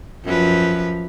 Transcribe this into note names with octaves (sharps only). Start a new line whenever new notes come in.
F#2 F3 B4